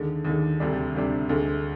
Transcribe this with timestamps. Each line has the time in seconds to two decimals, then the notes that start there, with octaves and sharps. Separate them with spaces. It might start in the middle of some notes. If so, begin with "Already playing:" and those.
Already playing: D#2 D3 G#3
0.25 D#2 D3 G#3
0.60 D2 C3 G3 D4
0.95 D2 C3 G3 D4
1.29 D2 D3 G#3